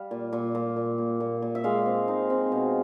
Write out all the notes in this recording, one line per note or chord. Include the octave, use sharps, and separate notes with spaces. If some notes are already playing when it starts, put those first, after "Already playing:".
Already playing: G3 F5
A#2
A#2
A#2
A#2
A#2
A#2
A#2
E5
G#3 F5
C4
D#4
C4
B2